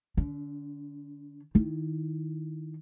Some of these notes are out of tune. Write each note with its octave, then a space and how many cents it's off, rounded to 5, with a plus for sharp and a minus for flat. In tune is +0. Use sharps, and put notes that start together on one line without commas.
D3 +0 D4 -45
D#3 +0 E4 +0